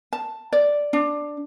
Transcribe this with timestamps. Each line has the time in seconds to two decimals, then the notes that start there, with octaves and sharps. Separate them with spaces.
0.13 A5
0.53 D5
0.93 D4